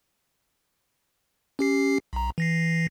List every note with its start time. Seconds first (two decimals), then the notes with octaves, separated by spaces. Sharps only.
1.59 C#4 G4 C7
2.13 B1 A#5
2.38 E3 A#6 C7